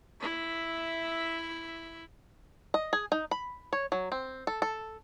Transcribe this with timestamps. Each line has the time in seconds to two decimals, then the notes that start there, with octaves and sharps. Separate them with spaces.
0.20 E4 E5
2.74 D#5
2.93 G#4
3.12 D#4
3.31 B5
3.73 C#5
3.92 F#3
4.12 C4
4.47 A4
4.62 A4